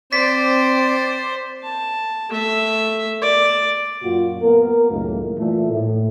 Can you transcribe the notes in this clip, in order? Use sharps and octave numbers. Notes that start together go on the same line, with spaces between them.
C4 C5 D5 B6
A5
A3 E5
D5
F#2 A#2 F4 F#4
A#3 B3 A#4
C#2 F#2 A2 D#3 A#3
A#2 E3 A3
A2